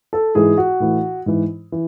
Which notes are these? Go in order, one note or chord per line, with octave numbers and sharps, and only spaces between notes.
A4
G#2 E3 G#4
F#4
A2 E3
G#2 E3
E3